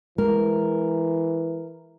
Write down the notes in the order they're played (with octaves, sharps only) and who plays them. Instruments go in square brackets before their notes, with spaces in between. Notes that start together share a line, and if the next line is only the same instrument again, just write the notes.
[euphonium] E3 [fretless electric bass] G#3 [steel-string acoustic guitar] A#4